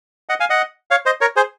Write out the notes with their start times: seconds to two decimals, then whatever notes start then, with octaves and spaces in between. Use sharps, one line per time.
0.29 D#5 F#5
0.40 F5 G#5
0.50 D#5 F#5
0.91 C#5 F5
1.06 C5 D#5
1.21 A#4 C#5
1.36 G#4 C5